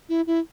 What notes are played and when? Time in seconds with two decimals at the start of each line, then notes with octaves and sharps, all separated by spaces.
0.09 E4
0.27 E4